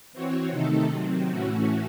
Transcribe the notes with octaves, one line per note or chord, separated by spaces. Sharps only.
E3 C4 F#4 C#5
C3 D#3 A3 D#4 A4
C3 D#3 F#3 C4
A2 E3 A3 C#4 F#4